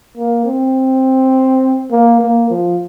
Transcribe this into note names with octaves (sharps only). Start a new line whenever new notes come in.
A#3
C4
A#3
A#3
F3